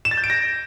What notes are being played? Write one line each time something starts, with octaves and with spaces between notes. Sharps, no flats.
E7
A6
G6
D7
A#6